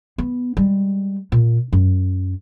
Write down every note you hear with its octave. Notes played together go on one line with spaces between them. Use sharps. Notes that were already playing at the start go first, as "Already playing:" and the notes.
B3
G3 G#3
A#2
F#2